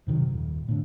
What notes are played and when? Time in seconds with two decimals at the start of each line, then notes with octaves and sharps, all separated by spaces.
0.07 F#2 C3 D#3 F#3
0.31 D#1
0.69 A2 D3